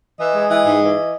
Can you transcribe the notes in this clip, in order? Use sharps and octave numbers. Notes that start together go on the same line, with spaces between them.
E3 D#5
G#3
E3
G#2
E3